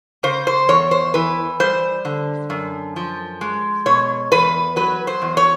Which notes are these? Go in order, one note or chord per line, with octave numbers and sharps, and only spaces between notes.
C#3 C5
C5
E2 C#5
C5
E3 B4
G3 C5
D3
F#2
F3
G#3
B2 C#5
E2 B4
F#3 B4
C5
E2
C#5